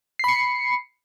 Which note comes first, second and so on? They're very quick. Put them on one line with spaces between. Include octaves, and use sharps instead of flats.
C7 B5 C#7